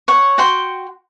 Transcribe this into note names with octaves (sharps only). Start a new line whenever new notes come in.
C#5 F#5
F#4 F#5 G5 C6